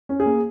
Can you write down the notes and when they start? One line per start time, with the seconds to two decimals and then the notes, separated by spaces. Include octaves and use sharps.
0.09 C#4
0.20 G#4
0.25 A#3